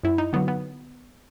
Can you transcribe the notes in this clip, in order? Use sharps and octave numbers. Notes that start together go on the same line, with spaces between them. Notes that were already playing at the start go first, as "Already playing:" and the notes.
F#2 E4
D#4
D3 F#3 B3
B3